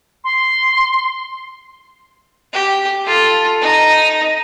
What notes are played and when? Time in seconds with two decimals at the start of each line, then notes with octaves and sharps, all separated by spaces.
0.24 C6
2.53 G4
3.04 F4 A4
3.61 D#4